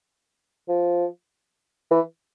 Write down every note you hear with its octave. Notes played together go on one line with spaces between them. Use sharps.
F3
E3